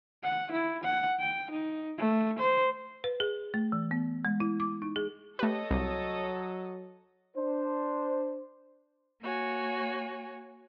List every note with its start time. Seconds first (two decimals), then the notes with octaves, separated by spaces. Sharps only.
0.23 F#5
0.52 E4
0.84 F#5
1.19 G5
1.50 D#4
1.98 A3
2.39 C5
3.04 B4
3.20 G#4
3.54 A3
3.72 E3
3.91 B3
4.25 G#3
4.40 E4
4.60 D6
4.82 D#4
4.96 G#4
5.39 A3 G4 A4 B4 C#5 D#5
5.71 C2 F#3
7.36 D4 C5
9.21 A#3 F#4 C#5 G#5